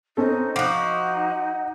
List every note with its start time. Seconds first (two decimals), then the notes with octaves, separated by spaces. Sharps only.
0.17 C4 C#4 D#4 A4
0.56 F3 D#4 F#4 F#5 D6